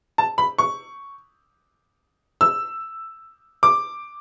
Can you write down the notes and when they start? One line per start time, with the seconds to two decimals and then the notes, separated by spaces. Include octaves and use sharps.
0.18 A5
0.38 B5
0.59 C#6
2.41 E6
3.63 D6